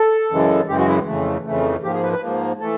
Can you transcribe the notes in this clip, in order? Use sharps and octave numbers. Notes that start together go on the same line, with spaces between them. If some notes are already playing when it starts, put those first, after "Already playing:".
Already playing: A4
F#2 C#3 E3 G#3
F#2 C#3 E3 G#3 G4
F#4
E4
F2 C#3 E3 A3
F2 C#3 E3 A3
G#2 F3 A#3 G4
G#4
B4
B4
G#2 F3 A#3
E3 A3 A4